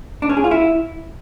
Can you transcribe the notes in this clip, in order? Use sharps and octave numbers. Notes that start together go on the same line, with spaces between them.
D4
C#4
G#4
F4
E4